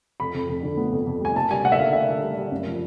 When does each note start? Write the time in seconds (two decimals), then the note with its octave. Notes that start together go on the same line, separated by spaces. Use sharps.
0.20 F2 B5
0.34 F2
0.49 F2
0.63 D3
0.77 B3
0.92 F2
1.07 F2
1.21 G3 G#5
1.36 A#3 A5
1.51 G3 G#5
1.65 A#3 F#5
1.72 E5
1.79 D3 F5
1.93 A#3 E5
2.09 D3
2.23 G3
2.38 G3
2.52 F#2
2.67 F3